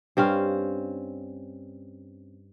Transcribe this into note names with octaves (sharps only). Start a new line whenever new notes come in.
G2 C4 C#4 F5